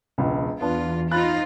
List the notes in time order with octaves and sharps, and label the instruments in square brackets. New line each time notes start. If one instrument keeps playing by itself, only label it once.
[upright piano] E1 C#2
[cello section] E2 F4 [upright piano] B3 D4
[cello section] D#4 F4 C5 [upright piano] B5 F#6 A6